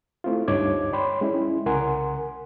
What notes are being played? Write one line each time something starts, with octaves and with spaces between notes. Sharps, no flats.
A3 C4 E4 F4
D2 G2 D#4 C#5 D6 G#6
C#5 D5 G5 B5 C6
G#3 C#4 E4
C2 C#3 A#4 F#5 G#5 C6